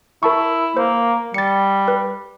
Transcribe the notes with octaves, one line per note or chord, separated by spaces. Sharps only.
E4 A#4 A5 C#6
A#3 C5
G3 A6 C#7
B4